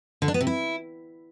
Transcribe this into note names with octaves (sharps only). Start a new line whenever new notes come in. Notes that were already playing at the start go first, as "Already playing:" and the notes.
D3
D4
B3
C3
E4